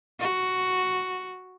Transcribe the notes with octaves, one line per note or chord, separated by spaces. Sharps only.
F#4